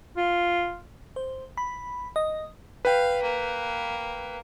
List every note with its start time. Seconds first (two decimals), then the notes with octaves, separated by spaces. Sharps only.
0.17 F4
1.16 C5
1.57 B5
2.16 D#5
2.85 B4 F5 G5
3.22 A#3